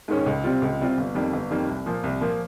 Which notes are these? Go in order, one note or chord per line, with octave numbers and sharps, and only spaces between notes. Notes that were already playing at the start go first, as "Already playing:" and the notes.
G#2 D#3 G#3 C#4
C#2
C3 G3 C4 F4
C#2
C3 G3 C4 F4
G1
F2 D#3 G3 A#3
G1
F2 D#3 G3 A#3
C2
A#2 F3 A#3
C2
A#2 F3 A#3